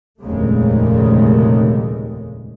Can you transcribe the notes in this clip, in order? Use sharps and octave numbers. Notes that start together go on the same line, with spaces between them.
F1 D#2 A#2 C#3 G#3 A3